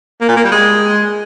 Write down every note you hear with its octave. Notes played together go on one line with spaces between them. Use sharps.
A#3
A#2
A#3
G3
G#3